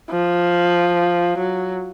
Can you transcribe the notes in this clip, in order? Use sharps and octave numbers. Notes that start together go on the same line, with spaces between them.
F3
F#3